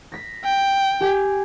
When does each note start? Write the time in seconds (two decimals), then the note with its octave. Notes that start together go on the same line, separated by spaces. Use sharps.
0.12 A#6 B6
0.44 G5
1.01 G4 G#5